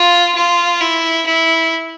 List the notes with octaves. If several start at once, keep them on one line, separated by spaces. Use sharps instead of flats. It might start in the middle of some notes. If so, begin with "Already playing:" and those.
Already playing: F4
F4
E4
E4